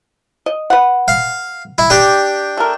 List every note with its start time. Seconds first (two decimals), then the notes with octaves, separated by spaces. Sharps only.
0.46 D#5
0.70 B4 F#5
1.08 F5
1.78 E4
1.90 D4 G4
2.57 A3 A#4